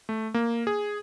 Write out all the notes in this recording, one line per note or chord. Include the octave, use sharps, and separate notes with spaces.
A3
A#3
G#4